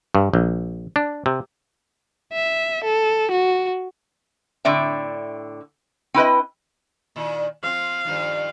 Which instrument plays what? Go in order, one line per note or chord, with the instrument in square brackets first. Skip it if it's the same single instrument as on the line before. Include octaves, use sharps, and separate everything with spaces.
[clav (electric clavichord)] G2
A#1
D4
C3
[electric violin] E5
A4
F#4
[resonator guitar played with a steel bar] A2 D3 C4 D5 E5
C4 E4 B4 D#5
[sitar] A#2 D#3 E4
[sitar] F3 C4 [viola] F5
[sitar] G2 D#3 F3